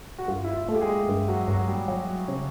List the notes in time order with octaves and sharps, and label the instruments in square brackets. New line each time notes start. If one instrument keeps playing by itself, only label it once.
[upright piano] F#4
[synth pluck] G2 [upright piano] F4
[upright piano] E4
F4
[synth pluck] A3
[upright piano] G4
G#3 G#4
[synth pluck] G2
[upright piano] F#3 F#4
[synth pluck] G2 [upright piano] F#3 F#4
[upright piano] G3 G4
[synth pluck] F#3
C#3